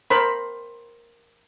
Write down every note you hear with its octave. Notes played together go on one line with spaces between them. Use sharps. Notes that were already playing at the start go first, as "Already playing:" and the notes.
A#4 C5 B5